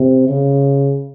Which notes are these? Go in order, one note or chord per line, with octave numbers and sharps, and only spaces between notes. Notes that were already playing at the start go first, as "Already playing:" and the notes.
Already playing: C3
C#3